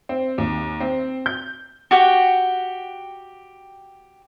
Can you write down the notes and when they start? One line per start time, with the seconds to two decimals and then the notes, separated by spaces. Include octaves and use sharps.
0.09 C4
0.38 D#2
0.80 C4
1.26 G6
1.91 F#4 G4 F#5 G5